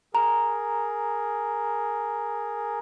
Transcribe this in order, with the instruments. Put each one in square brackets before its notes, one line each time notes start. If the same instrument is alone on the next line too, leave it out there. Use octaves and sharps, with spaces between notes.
[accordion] G#4 A#4 [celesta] A#5